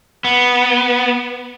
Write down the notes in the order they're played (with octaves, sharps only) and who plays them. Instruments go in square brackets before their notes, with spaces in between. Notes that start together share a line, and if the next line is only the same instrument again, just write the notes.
[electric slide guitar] B3